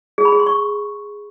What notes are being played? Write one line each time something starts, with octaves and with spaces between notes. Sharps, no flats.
G#4
B5
G#4
C6
C#6